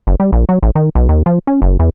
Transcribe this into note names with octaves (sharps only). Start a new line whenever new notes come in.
F#1
G3
A#1
F#3
A1
D#3
B1
D#2
F3
C#4
F#1
E2